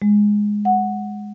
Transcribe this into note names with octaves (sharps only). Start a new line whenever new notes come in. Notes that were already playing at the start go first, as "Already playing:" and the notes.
G#3
F#5